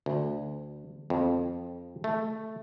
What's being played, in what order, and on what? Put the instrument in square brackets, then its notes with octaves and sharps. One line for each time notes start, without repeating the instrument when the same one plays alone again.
[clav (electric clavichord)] D2
F2
A3